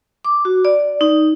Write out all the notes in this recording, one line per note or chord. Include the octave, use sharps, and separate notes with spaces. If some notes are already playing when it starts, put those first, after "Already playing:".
D6
F#4
D5
D#4